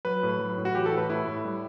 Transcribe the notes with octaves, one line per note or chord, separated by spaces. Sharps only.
F#3 B4
A2
F#3
A2
F#4
E3 G4
A4
A2 B4
A2 E4
A2
G3